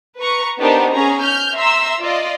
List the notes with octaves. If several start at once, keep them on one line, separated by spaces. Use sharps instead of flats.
B4 A#5 C#6 C#7
B3 D4 D#4 G4 A#4 C5
C#4 G#4 A#5
F6 G6
E5 A#5 C6 E6
F4 D5 D#5